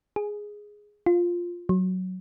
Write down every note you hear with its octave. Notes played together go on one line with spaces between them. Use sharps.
G#4
F4
F#3